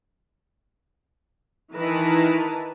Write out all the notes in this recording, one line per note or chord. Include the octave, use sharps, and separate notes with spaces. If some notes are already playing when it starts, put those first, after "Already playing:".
D#3 E3 E4 B4 A5 A#5